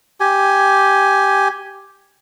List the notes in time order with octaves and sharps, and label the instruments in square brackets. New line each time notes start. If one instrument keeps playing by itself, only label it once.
[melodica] G4 G#5